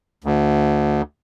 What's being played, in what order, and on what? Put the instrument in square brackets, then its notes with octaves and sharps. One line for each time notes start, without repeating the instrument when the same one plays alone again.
[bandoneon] D2